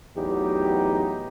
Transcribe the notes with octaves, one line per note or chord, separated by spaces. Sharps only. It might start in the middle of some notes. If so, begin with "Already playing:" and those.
A1 E2 F#3 D#4 G4